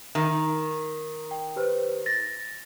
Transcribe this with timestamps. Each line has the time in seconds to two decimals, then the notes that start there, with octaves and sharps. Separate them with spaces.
0.15 D#3
1.31 G5
1.56 G4 B4 C5
2.06 A6 A#6